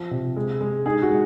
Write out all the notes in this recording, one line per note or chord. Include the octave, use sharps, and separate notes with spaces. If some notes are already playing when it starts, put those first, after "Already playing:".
Already playing: F3
C3
G#3
G#3
D#4 G#4
F#4
G#3